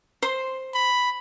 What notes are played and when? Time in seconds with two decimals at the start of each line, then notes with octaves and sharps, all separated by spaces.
0.22 C5 C6
0.74 B5